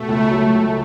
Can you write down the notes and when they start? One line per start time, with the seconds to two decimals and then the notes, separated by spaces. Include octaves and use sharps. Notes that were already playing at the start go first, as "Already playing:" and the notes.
Already playing: B2 A3
0.09 C#2
0.31 F#3
0.55 C#2